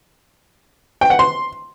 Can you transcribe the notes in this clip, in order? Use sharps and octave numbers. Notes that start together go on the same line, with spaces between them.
G5
F#5
C6